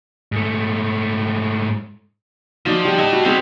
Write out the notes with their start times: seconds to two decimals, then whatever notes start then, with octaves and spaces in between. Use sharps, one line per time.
0.32 G#2 A3
2.66 F3 F#3 D#4 D5
2.85 G3 F#5
2.99 E4 D#5 A5
3.13 F#4
3.25 G3 B3 C4 G#4